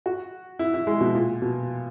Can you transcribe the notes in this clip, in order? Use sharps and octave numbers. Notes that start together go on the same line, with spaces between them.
F#4
E4
E4
G#3
B2
A#2
B2